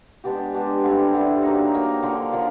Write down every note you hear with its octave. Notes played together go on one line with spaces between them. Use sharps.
G#3 B3 D4 G4
G#3 B3 D4 G4
D3 G3 C4 E4
D3 G3 C4 E4
F#3 A#3 D#4
F#3 A#3 D#4
D3 F3 A#3
D3 F3 A#3